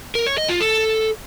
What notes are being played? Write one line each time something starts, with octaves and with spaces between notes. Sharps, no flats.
A#4
C#5
D#5
F4
A4